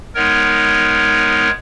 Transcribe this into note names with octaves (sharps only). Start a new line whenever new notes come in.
G#3 B3 D#4 A#4 C#5